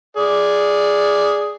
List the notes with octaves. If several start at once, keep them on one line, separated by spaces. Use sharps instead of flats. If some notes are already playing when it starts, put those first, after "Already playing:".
G#4 D5